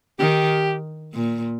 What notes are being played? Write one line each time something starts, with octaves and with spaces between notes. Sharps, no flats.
D#3 G4
A#2